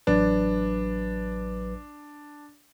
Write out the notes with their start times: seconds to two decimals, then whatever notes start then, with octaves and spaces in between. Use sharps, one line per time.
0.07 A1 F#3 D4 B4